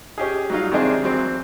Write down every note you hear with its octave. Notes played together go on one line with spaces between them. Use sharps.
C#4 G4 G#4
F#3 G3 D#4 F4
C3 D#3 G#3 C4 D4 G#4
E3 F#3 C4